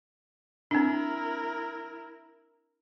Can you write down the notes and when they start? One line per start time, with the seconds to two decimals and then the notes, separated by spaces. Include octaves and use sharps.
0.71 C4 D4 E4 A#4